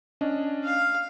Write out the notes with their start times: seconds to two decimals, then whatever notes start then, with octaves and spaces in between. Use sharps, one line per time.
0.21 C#4 D4 D#5
0.64 F5